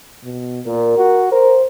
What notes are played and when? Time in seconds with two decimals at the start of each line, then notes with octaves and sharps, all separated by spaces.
0.23 B2
0.66 A#2 A#4
0.98 F#4
1.32 A#4 C5